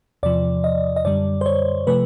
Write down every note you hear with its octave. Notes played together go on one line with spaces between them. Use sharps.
E2 C3 F3 D5
D#5
D#5
F#2 D3 G3 D5
C5
C#5
C3 F3 A3 B4